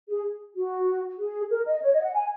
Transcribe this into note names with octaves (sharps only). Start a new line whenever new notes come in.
G#4
F#4
G#4
A#4
D#5
C#5
D#5
F#5
G#5